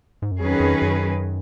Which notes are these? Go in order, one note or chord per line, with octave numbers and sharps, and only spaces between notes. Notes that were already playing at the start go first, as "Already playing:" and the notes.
G#2
F#2
F2 D#3 F#3 C#4 G#4 B4
F2
F#2